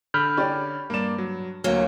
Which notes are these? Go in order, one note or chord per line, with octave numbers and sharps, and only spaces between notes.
D3 B5 F6 G6
C#4 G4 D5
G2 A#3 D5 E7
F#3
D2 F#3 A#3 F6